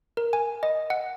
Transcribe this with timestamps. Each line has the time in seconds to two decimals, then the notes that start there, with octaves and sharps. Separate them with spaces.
0.17 A#4
0.33 G#5
0.63 D#5
0.90 F#5